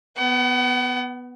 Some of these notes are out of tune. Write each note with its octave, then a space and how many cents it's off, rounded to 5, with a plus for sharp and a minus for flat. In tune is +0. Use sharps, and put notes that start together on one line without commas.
B3 +0 F#5 +40